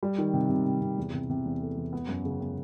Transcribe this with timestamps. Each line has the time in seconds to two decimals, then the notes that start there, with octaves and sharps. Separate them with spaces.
0.03 G3
0.18 D#3
0.33 C3
0.49 C3
0.66 C3
0.81 C3
0.98 E2
1.14 C3
1.29 C3
1.45 E2
1.61 A3
1.77 E2
1.93 B3
2.08 F#2
2.25 C#3
2.41 B3